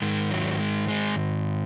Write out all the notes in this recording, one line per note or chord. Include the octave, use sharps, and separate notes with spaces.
G#2 D#3 G#3
F#3
G#3
G#3